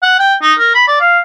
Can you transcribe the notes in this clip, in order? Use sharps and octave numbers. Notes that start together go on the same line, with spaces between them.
F#5
G5
D#4
A#4
B5
D5
F5